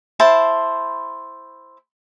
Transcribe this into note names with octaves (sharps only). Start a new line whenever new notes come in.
E4 C5 A5